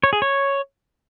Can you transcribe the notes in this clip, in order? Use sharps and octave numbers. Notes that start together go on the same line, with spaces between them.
C#5
G#4
C#5